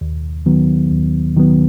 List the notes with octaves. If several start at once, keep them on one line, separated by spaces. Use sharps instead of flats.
D#2
D#3 F#3 B3
D#2
D#3 F#3 B3